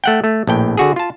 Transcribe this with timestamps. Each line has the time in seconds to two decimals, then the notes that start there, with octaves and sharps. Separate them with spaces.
0.04 A3 F#5 G5
0.24 A3
0.47 A#1 A2 G5
0.77 D3 F#4 G#4
0.96 F4 A5